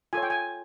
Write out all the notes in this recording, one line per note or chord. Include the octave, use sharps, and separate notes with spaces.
F4 A4 C#5 G#5
G5
G#5